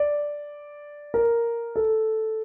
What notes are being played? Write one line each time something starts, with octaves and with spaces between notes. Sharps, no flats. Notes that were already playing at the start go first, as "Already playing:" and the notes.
Already playing: D5
A#4
A4